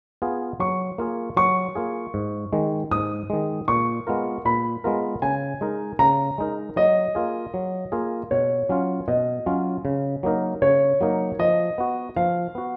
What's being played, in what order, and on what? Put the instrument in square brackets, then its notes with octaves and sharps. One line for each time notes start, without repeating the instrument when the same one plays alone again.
[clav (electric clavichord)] B3 F4 G#4
[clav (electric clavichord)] F#3 [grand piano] C#6
[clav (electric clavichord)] A#3 F4 G#4
[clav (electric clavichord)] F#3 [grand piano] C#6
[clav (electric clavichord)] A#3 F4 G#4
G#2
D#3 G#3
[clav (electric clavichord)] G#2 [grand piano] D#6
[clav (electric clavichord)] D#3 G#3
[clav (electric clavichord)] A#2 [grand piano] C#6
[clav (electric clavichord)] G#3 B3 F4 A#4
[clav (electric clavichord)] A#2 [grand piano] B5
[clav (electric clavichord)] G#3 B3 F4 A#4
[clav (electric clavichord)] C#3 [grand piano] G#5
[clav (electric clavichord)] G#3 D#4 A#4
[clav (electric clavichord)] C#3 [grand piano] A#5
[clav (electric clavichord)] G#3 D#4 A#4
[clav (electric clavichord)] F#3 [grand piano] D#5
[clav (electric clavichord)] A#3 F4 G#4
F#3
A#3 F4 G#4
[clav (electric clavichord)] B2 [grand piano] C#5
[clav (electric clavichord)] F#3 C#4 F4
[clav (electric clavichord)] B2 [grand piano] D#5
[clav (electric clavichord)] F#3 C#4 F4
C#3
F#3 A#3 D#4 A#4
[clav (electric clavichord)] C#3 [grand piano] C#5
[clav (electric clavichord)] F#3 A#3 D#4 A#4
[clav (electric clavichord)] F3 [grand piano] D#5
[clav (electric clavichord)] B3 F#4
[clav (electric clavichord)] F3 [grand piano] F5
[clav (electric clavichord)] B3 F#4